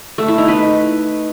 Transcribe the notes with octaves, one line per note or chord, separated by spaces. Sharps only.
A3
E4
D#4
B4